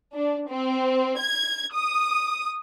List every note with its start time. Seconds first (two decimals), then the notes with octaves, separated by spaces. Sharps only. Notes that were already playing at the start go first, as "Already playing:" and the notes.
0.13 D4
0.48 C4
1.18 G#6
1.73 D#6